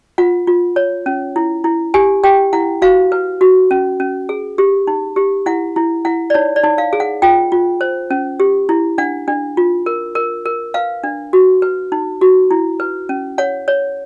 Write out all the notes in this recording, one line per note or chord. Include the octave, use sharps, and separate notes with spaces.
F4 F#5
F4
C#5
C#4
E4
E4
G4 G#5
G4 G5
E4 F#5
F#4 F5
B4
F#4
C#4
C#4
G#4
G4
D#4
G4
E4 F#5
E4
E4 F#5
D5
D#4 C#5
D5
D#4
F5
G#4
F#5
F4 G5
F4
C5
C#4
G4
E4
D4 F#5
D4
F4
A#4
A#4
A#4
B4 F5
D4
F#4
B4
D#4
F#4
E4
B4
C#4
C#5 F#5
C#5